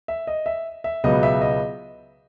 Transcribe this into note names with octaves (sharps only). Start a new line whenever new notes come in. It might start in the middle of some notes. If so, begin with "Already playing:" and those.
E5
D#5
E5
E5
C#2 B2 F#3 B3 D#5
E5
D#5